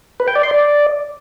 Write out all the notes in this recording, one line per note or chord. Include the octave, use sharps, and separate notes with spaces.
B4
G5
D5
C6
D5